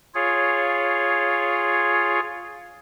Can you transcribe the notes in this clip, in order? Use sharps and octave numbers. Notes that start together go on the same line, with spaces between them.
F4 G#4 C#5